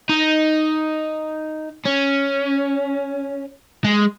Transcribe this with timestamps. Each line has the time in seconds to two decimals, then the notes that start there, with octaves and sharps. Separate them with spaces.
0.09 D#4
1.86 C#4
3.85 G#3